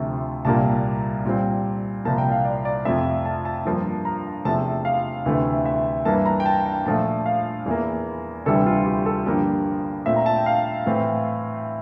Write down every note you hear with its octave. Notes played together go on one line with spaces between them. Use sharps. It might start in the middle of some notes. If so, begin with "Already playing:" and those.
Already playing: D2 C3 F3 A3
C2 A#2 G3 A#3 A5
A#2 G3 C4
C2 A#2 F3 A#3 A5
G5
F5
D5
D5
F2 C3 F3 A3 C4 E5
A5
A5
G2 F3 A#3
A#5
E2 C3 F3 A3 A5
F5
D2 C3 E3 A3
E5
G2 E3 A#3 A5
A#5
G5
A5
G5
A#2 F3 A3 A5
F5
E2 E3 A#3
D2 C3 E3 G3 A4
F4
G4
A4
G2 D3 F3 A#3 G4
A#2 A3 C4 E5
A#5
A5
G5
F5
A2 E3 A3 C4